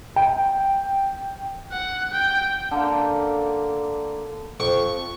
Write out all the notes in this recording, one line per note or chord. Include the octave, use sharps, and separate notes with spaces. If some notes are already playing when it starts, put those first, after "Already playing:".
G5
F#5
G5
D3 A#3
F2 C#6